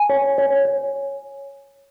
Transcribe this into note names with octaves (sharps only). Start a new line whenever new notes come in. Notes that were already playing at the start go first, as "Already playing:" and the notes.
Already playing: G#5
C#5
C#5
C#5